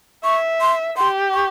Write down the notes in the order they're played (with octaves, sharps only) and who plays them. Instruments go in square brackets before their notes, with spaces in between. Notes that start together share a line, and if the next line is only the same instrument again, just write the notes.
[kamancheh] E5 [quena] C#6
[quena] C6
[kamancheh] G4 [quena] C6
[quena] C#6